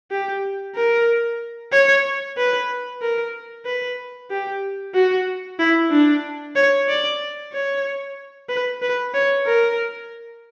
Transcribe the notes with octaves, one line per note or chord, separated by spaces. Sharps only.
G4
A#4
C#5
B4
A#4
B4
G4
F#4
E4
D4
C#5
D5
C#5
B4
B4
C#5
A#4